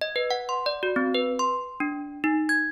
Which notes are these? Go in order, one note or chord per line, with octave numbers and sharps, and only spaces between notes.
D#5
B4
F#5
C6
D5
F#4
C4
B4
C6
D4
D#4
G#6